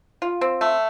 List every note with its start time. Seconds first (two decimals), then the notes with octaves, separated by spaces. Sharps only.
0.22 F4
0.41 C4
0.61 A3